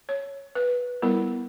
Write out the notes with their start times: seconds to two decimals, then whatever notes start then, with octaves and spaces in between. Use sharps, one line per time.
0.09 C#5
0.55 B4
1.02 G3 B3 E4 A#4